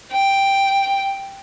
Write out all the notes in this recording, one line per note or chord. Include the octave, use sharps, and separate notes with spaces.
G5